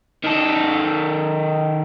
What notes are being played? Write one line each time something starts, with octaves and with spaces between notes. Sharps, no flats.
D#3 A4